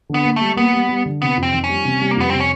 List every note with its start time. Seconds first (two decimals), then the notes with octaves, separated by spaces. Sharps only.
0.09 D3 B3
0.25 A#3
0.36 G3 A3
0.57 A#3 B3
0.73 G3
0.89 G3
1.06 D3
1.21 C3 B3
1.37 F2
1.43 C4
1.53 D#3
1.64 C#4
1.69 G3
1.85 C3
2.01 G3
2.11 A#3
2.17 F2 B3
2.30 C3 C4
2.40 C#4